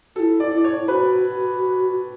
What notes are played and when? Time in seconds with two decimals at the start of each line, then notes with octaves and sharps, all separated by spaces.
0.16 E4 F#4 A4
0.40 D5
0.51 E4
0.57 D5
0.64 C#5
0.88 F#4 B4